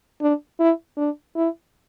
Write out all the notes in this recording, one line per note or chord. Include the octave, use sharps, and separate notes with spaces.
D4
E4
D4
E4